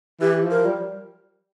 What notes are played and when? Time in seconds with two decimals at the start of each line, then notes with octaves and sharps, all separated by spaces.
0.21 E3 G4
0.43 F3
0.51 A#4
0.65 G3